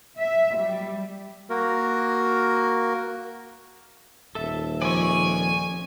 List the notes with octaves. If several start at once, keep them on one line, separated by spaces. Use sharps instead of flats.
E5
G3
A#3 F#4 A#4
D#1 A4 E5
F2 D5 G#5 C#6